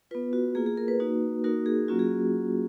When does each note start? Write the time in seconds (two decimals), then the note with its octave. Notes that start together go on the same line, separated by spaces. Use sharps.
0.11 F4 B4
0.15 B3
0.33 F#4
0.55 A#3 F4 G#4
0.66 G#4
0.77 A#4
0.88 B4
1.00 A#3 D#4 F#4
1.44 A#3 D#4 F#4 A#4
1.66 G#4
1.88 F#3 A#3 C#4 F4 F#4
1.99 G#4